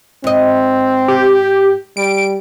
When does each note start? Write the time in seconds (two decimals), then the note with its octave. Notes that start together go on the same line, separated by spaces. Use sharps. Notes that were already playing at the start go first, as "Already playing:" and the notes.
0.24 G#2 C4 D#5
1.08 G4
1.97 G3 D7